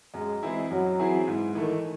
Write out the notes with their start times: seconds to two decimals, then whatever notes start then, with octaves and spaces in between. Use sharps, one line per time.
0.14 F#2 G#3
0.42 E3 G#3 C4 E4 G#4
0.71 F#2 F#3
0.99 E3 C4 E4 G#4
1.27 G#2 E3
1.55 D#3 E3 A3